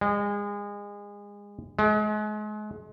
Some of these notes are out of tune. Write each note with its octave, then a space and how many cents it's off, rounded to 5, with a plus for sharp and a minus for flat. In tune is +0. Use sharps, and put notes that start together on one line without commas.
G#3 -30
G#3 +35